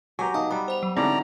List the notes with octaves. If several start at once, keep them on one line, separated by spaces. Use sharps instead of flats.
F#3 G4 G#5 A#5 C#6
D#4 F5 G#5 A5 D#6
G3 B3 A#5
C5 F#5 F7
F#3
G#2 D3 E3 F#3 C4 D5 A#5